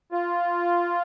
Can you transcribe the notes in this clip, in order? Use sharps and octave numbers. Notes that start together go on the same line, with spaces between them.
F4